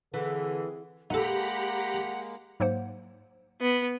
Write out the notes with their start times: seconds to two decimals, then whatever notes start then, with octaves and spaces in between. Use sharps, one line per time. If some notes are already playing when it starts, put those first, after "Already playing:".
0.14 D3 E3 C4 G#4
1.10 G#3 A#3 D#4 G4 A4 F#5 A#5 B5
2.60 G#2 F#3 A#3 C5 F#5
3.61 B3